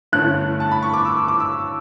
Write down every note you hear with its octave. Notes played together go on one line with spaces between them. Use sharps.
G2 D3 A3 C#4 E4 F#6
A5
B5
C#6
D6
E6
D6
D6
E6